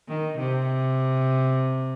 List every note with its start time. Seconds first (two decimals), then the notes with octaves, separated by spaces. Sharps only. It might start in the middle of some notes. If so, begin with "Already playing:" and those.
0.09 D#3
0.38 C3